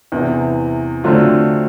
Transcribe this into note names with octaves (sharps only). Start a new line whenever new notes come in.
E2 C3 E3
D3 F#3 A3 C4 F4